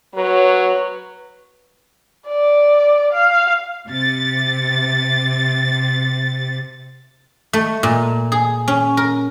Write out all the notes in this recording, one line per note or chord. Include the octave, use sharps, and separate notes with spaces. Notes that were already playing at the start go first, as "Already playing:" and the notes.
F#3 B4 C#5
D5
F5
C3 A6
A3
A#2
G#4
C#4
A#4